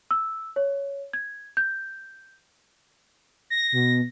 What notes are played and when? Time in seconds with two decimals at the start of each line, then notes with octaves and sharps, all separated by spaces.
0.11 E6
0.56 C#5
1.13 G#6
1.57 G6
3.50 A#6
3.72 B2